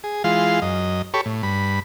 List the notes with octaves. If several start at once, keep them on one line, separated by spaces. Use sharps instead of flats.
G#4
E3 G#3 F4 F5 C6
F#2 D#5
G4 A4 C#5 B5 C#6
A2
G2 B5